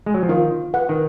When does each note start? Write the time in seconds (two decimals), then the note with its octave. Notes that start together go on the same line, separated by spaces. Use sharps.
0.06 G#3
0.14 F#3
0.23 F3
0.29 D#3 F4
0.74 B4 F#5
0.89 D#3